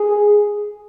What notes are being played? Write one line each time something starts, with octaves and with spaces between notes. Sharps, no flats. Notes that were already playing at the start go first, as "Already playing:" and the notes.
Already playing: G#4